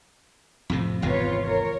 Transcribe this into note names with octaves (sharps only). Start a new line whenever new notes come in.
F2 A2 C3
G#1 E2 C3 F4 B4 C#5
A#4 C#5